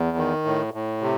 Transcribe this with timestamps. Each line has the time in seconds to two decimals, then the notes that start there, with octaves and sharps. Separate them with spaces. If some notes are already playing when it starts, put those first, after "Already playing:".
Already playing: E2
0.17 D#3
0.45 A2
0.74 A2
1.01 C3